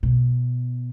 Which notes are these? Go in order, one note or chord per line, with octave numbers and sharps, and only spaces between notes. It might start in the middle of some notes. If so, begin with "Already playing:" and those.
B2